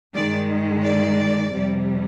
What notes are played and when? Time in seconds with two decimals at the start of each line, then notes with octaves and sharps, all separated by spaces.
0.14 G2 D#3 G#3 D5
0.83 D5
1.51 F2 C3 G3